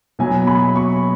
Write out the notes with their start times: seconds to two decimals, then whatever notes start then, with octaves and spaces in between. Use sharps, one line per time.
0.19 B2 F#3 B3 G#5
0.47 B5
0.76 C#6